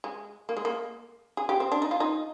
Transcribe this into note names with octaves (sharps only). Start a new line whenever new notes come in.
G#3
A#3
G#3
A#3
G#4
G4
C4
D4
D#4
F4
D#4